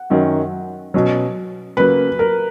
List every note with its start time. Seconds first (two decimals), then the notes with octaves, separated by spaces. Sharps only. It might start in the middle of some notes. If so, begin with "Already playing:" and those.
Already playing: F#5
0.10 F#2 D#3 F#3 C#4
0.94 B2 F#3 C#4
1.77 C#3 F#3 A#3 B4
2.19 A#4